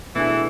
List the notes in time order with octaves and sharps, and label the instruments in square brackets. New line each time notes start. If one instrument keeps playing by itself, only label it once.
[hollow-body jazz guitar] B2 A3 D4 G#4 [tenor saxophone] E3